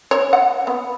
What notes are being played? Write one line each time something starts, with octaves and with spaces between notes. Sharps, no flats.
C#5
F#5
B3